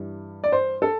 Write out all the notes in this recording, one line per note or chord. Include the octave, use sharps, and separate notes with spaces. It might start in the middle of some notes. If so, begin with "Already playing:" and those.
Already playing: G2 E3 G3
D5
C5
A4